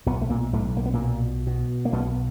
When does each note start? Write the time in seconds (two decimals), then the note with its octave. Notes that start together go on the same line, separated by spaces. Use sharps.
0.06 B1 B2 B3
0.21 A3
0.30 A#2 A#3
0.53 B1 A2 A3
0.77 A#3
0.86 B3
0.93 A#2 A#3
1.00 B2
1.47 B2
1.85 A#3
1.92 B1 B2 B3